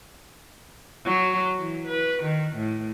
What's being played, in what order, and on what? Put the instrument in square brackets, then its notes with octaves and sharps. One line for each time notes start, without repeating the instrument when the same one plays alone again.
[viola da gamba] F#3
E3
B4
D#3
A2